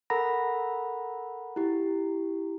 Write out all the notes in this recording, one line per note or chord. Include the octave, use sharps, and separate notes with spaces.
A4 A#4 F#5 A#5 B5 A#6
E4 G4